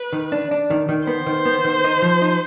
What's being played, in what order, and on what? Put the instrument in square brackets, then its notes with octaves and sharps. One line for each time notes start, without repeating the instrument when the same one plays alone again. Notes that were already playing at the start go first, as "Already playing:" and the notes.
Already playing: [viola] B4
[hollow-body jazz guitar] D#3
D4
D4
D#3
D#3
[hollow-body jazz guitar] B3 [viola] C5
[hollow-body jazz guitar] D#3
B3
D#3
D#4
F3
D#4